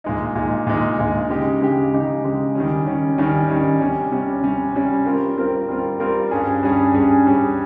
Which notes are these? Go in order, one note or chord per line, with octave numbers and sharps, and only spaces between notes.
A#2 G#3 D#4
A#2 G#3 D#4
A#2 G#3 D#4
A#2 G#3 D#4
C#3 G#3 D#4 G4
C#3 G#3 D#4 G4
C#3 G#3 D#4 G4
C#3 G#3 D#4 G4
D#3 G3 C#4
D#3 G3 C#4
D#3 G3 C#4
D#3 G3 C#4
C3 G3 C#4
C3 G3 C#4
C3 G3 C#4
C3 G3 C#4
G3 C4 F4 A#4
G3 C4 F4 A#4
G3 C4 F4 A#4
G3 C4 F4 A#4
G2 G3 C#4 G#4
G2 G3 C#4 G#4
G2 G3 C#4 G#4
G2 G3 C#4 G#4